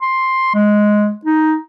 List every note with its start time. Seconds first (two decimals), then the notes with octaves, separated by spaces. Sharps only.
0.01 C6
0.55 G#3
1.25 D#4